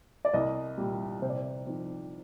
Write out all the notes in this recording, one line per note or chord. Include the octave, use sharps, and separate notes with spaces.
D5
C2 D#5
A#2 G3
C3 C5
D5
C5
F3 C4 D#4